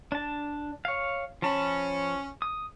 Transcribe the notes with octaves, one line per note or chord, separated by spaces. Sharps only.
D4 A5
C#5 F5
F3 C#4 A5 B5
D#6